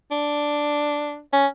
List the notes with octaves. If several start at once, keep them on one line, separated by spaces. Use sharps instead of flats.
D4
C#4